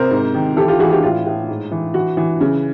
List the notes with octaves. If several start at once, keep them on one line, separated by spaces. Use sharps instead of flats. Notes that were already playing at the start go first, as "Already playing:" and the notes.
Already playing: C3 A#4 C5
G#2
D#3
E3 G4 A4
F4 G4
E3 F#4 G#4
F4 G4
A2 F4
A2
G#2
E3
E3 F#4
E3
C#3